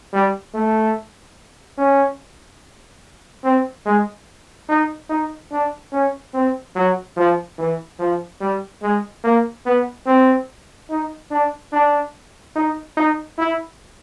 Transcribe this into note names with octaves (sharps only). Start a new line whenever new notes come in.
G3
A3
C#4
C4
G#3
D#4
D#4
D4
C#4
C4
F#3
F3
E3
F3
G3
G#3
A#3
B3
C4
D#4
D4
D4
D#4
D#4
E4